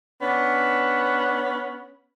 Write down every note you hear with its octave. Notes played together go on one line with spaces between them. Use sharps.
B3 C#4 D4